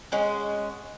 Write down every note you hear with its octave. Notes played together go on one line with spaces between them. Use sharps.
G#3 C#4 F#4